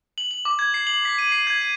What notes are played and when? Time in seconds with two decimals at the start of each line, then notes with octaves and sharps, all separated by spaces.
0.18 F#7
0.31 F#7
0.45 D6
0.59 G#6
0.74 C7
0.87 F#7
1.05 B6
1.18 D#7
1.32 C7
1.47 G#6
1.61 D#7